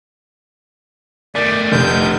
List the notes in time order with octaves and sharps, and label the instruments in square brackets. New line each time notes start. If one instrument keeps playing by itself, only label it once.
[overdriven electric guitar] D#3 A3 [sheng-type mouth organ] D5 [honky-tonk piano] B6
[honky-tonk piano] F1 [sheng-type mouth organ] G6